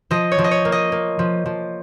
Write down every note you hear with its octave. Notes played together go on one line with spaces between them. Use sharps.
F3 D#5
C#5
F3
D#5
C#5
A#3
D#5
A#3
F3
F3